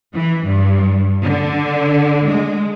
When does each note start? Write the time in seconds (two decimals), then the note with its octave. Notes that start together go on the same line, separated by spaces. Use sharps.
0.14 E3
0.45 G2
1.23 D3
2.27 G#3